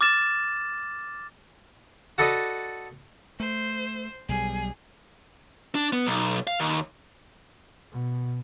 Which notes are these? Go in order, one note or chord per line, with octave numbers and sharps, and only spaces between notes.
D6 F6 A6 E7
F#4 A4 B4 D5 D#5
A3 C5
B1 G3 G#4
D4
B3
B1
F5
D#2
B2